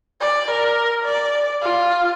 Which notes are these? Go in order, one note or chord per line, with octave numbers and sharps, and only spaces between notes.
D5
A#4
D5
F4